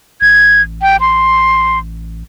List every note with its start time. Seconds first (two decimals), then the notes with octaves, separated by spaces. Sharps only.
0.21 A1 G#6
0.82 G5
1.01 C6